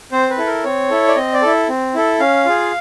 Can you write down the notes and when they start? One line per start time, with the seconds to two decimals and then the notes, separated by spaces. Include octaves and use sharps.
0.12 C4 C5
0.30 B4
0.38 E4 A4
0.46 A#4
0.64 C4 C#5
0.90 E4 A4
1.08 D5
1.16 C4 D#5
1.33 D5
1.42 E4 A4
1.69 C4
1.95 E4 A4
2.20 C#4 F5
2.45 F4 G#4